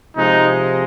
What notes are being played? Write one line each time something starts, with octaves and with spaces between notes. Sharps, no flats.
C3 F3 G#3 D#4